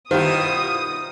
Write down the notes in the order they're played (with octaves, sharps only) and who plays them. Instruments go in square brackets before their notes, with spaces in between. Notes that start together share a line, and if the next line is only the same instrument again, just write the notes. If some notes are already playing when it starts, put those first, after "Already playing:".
[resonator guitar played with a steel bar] G2 D#3 [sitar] B2 E4 F4 [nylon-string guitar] G4 C5 [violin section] D#6